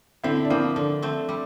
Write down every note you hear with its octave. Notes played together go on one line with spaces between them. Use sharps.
D3 C4 E4
D4
F3 A#3 C4 E4
D3 D4
A3 C4
G3